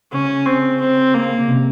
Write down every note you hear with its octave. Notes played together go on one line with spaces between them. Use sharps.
C#3 C#4
C4
C4
A#3
C#3
C3